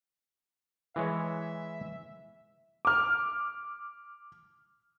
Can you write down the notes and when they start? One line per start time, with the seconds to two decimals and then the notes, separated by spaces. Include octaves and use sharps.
0.96 E3 G#3 C#5 E5
2.85 D6 F6